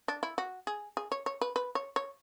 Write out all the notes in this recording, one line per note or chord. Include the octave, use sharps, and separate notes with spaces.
D4
E4
F#4
G#4
G#4
C#5
C#5
B4
B4
C#5
C#5